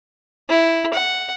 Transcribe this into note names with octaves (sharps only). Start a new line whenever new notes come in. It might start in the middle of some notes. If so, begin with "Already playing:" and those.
E4
F#5